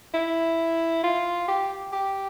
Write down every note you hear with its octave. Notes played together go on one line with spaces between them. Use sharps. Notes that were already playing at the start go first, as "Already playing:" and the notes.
E4
F4
G4
G4